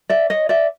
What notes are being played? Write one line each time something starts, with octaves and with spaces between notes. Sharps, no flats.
D5 E5
C#5 D#5
D5 E5